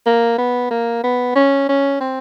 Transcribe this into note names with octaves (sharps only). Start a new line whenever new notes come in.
A#3
B3
A#3
B3
C#4
C#4
C4